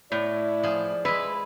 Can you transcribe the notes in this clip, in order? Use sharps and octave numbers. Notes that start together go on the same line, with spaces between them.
A2 E4 D5
F3 G#4
G#3 E4 B4